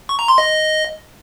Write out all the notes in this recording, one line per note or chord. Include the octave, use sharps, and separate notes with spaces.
C#6
A#5
C6
D#5